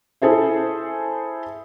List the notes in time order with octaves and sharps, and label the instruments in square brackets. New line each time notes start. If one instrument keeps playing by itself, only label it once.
[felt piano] E4 G#4 A4 C5 E5